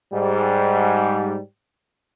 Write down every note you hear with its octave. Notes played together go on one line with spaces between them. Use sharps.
G#2 G3